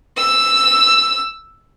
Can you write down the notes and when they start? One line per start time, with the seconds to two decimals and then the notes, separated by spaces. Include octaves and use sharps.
0.18 E6